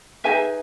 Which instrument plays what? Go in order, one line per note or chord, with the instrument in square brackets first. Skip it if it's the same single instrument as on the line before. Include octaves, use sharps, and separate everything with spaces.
[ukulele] D#4 G#4 B4 E5 G#5